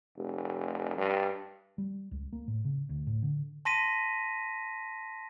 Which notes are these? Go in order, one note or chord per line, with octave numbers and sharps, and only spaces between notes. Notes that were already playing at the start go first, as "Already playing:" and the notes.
F1
G2
G3
C#2
A#3
A2
C#3
D2
A2
D3
A5 C6 A#6 B6 D#7